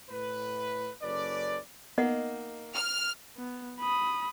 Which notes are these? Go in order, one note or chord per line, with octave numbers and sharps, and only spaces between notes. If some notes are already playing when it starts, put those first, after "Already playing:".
A2 B4
F#1 C#4 A4 B4 D5
A#3 B3 D#4 D#5 F#5
F6
B3
B5 D#6